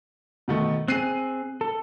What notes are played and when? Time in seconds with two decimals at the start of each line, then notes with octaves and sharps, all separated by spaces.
0.48 B2 D#3 A3
0.88 C4 G#4 F#6 C7 D#7
1.61 A4